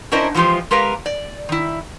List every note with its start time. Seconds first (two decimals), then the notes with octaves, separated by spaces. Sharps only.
0.12 C#4 D4 E4 A#4 C5 D#5
0.34 E3 F3 G#3 F4 G4 C5
0.71 G#3 G4 A#4 B4 F5
1.06 D5
1.49 D#3 E4